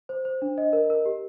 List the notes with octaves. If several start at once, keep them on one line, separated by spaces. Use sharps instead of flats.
C5
C5
D4
D#5
A#4
A#4
G4